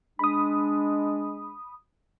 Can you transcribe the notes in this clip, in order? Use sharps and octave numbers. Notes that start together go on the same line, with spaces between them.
G#3 D4 B5 D#6